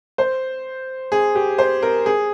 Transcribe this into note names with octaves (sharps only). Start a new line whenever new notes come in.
C5
G#4
G4
C5
A#4
G#4